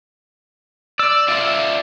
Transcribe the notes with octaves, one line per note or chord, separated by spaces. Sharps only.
D5 E6
F4 D5 E5